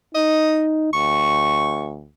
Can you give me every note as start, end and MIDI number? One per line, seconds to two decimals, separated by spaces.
0.15 0.89 63
0.15 0.64 75
0.93 2.10 38
0.93 1.89 85